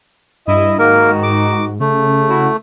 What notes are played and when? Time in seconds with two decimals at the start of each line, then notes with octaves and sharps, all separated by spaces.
0.47 G2 E4 D#5
0.79 G#2 D#3 A#3 D#4 F#4 A#4
1.23 D6
1.80 C#3 A3
2.29 E4 F#4